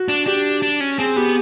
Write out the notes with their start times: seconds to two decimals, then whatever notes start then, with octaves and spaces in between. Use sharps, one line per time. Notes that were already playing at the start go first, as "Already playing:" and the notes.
Already playing: F#4
0.08 D4
0.26 D4 G4
0.62 D4
0.80 C#4
0.99 C4 G#4
1.16 B3 G4